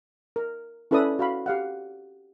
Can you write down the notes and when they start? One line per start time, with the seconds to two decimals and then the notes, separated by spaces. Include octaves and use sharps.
0.36 A#4
0.91 C#4 E4 A4 B4 D5 D#6
1.19 F#4 F5 B5
1.46 G4 F5 F#5